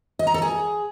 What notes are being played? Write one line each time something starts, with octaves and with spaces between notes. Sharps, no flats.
D#5
A#5
A4
G#4